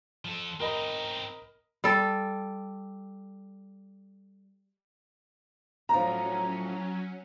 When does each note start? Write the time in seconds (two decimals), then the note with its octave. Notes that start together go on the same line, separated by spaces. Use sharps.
0.25 F3 A4
0.60 C4 D#4 A#4 D#5 B5
1.84 G3 A4
5.89 A2 F3 F#3 C#4 A#5